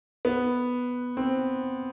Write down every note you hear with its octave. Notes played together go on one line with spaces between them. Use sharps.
B3
C4